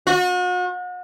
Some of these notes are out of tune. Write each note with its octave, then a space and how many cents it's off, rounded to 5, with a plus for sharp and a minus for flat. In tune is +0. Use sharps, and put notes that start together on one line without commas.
F#4 -40